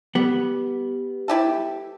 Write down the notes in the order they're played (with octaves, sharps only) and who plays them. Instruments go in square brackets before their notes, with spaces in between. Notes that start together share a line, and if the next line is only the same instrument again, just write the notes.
[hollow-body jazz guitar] G3 B3
[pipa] E4 G4 A4